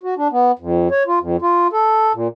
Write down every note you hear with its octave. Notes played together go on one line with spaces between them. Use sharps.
F#4
D4
B3
F2
C#5
F4
F2
F4
A4
A#2